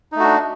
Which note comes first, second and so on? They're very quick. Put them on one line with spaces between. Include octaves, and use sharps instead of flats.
D#4 A3 F#4 D4